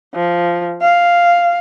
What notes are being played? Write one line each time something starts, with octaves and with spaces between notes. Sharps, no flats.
F3
F5